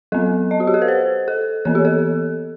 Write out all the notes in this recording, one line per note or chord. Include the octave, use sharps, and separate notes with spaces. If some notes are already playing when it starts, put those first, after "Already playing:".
F#3 B3 A4
D#5
F#4
G4
A4
B4
C5
A4
E3 B3 A4
G4
A4